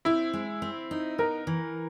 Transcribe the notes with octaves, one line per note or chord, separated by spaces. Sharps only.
C4 E4
G#3
C4
D#4
B3 A#4
E3